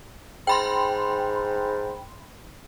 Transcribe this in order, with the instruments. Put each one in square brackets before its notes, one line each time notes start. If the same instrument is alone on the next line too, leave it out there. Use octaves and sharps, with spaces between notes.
[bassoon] G#2 [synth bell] G5 B5 C6